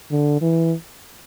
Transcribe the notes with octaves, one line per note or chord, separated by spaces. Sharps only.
D3
E3